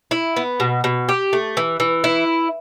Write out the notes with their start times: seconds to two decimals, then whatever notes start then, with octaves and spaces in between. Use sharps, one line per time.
0.11 E4
0.36 B3
0.60 B2
0.84 B2
1.09 G4
1.33 A3
1.57 E3
1.80 E3
2.04 E4